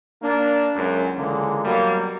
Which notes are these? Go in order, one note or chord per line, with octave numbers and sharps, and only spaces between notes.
A#3 D4
C#2 F#2
C#2 D3 E3 G#3 A#3
B2 F#3 G3 A#3